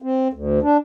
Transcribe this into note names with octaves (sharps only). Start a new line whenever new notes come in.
C4
D2
D4